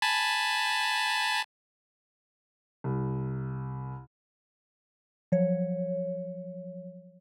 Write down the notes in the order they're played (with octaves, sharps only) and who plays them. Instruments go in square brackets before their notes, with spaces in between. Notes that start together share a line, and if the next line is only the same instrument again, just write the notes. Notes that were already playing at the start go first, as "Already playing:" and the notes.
[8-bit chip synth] G#5 A5 B5
[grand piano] C2
[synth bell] F3 F#3 C#5